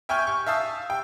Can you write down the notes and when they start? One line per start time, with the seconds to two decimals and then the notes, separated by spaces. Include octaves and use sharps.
0.09 E5 G5 G#5 C#6 F6 G6
0.27 C#6
0.46 E5 F5 A5 D#6 E6
0.90 G5